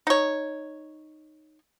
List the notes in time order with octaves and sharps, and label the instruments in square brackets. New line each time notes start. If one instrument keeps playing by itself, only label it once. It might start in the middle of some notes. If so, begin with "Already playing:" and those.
[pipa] D#4 C#5